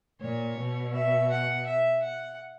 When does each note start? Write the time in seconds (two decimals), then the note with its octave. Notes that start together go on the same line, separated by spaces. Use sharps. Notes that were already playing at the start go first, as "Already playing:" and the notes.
0.20 A#2 C#5
0.57 B2
0.93 E5
1.31 F#5
1.67 E5
2.03 F#5